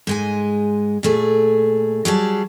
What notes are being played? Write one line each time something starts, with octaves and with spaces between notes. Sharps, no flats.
G#2 G#3 G#5
A#2 A3 G#4
F#3 G3 G#4 A5